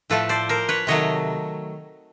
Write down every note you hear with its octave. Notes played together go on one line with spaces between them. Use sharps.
A2 F3 A3 A4 B4
C5 D5
A#4 C5
B4 C#5
C3 D#3 F#3 A3 C#5 D#5